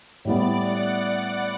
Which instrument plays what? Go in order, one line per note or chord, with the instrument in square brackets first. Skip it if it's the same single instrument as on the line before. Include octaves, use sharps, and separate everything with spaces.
[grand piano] A2 G3 B3 [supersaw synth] D5
[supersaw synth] F#5